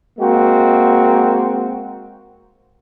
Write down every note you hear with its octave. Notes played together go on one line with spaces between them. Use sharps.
G#3 A#3 C4 F#4